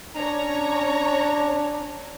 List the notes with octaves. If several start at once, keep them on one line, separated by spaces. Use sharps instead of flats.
C#4 D4 C#5 A#5